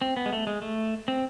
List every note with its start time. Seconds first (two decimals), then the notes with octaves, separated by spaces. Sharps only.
0.01 C4
0.17 B3
0.26 G#3
0.33 A3
0.47 G#3
0.62 A3
1.08 C4